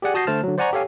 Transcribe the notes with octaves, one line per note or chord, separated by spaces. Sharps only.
G4 G#4 D5 F#5 G#5
F#4 A5 D#6 G6 A#6 C7
D3 A3 C5 A5 F6
D3 F#3
C5 D5 F#5 G#5 A#5 C#6
G4 A4 C#5 F5 G#5